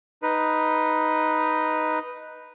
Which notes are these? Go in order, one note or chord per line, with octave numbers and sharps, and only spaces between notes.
D#4 B4